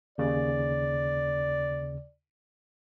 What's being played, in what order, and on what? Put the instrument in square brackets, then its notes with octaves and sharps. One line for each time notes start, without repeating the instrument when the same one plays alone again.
[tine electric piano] D#2 C#3 [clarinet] D5